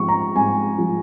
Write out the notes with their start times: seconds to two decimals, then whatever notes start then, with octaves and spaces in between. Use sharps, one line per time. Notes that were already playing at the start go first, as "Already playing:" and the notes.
Already playing: G#2 F3 C#6
0.08 A#5
0.36 G#2 G#5
0.78 F3